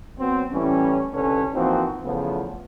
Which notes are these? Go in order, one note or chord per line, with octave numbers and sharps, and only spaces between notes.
F#3 B3 C4
A2 E3 G3 C#4
C2 D3 C#4 A4 B4
E3 F3 A#3 C4 D#4 F#4
E2 C#3 F3 A3 B3